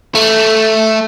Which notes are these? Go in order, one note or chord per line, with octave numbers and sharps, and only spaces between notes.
A3